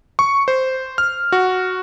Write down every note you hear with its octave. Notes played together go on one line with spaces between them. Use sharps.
C#6
C5
F6
F#4